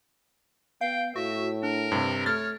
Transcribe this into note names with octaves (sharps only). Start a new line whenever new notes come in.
B3 F5 G5
A2 F#4 E5
D4 A#4
G2 C3
A3 C#5 F6 A6